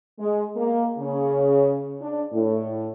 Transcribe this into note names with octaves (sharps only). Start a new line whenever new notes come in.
G#3
A#3
C#3
D4
A2